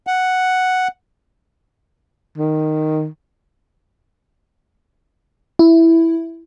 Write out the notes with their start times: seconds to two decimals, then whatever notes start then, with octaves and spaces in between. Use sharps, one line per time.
0.07 F#5
2.38 D#3
5.59 E4